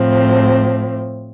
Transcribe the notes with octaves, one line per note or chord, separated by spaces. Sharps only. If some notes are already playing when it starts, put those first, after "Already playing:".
Already playing: A2 F3 C4